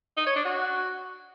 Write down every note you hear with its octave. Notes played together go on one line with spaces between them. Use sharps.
D#4
C#5
D4
F#4